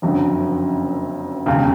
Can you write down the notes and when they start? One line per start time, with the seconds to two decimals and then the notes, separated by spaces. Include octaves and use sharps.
0.02 F#1 F2 D3 F#3
1.46 E1 D#2 C#3